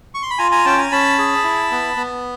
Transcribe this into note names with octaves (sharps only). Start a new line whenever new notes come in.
C#6
C6
B5
F4 G#5 A#5
G#5 A#5
C#4 G5 A5
G#5 A#5
C#4 A5 B5
G#4
E4
B3
B3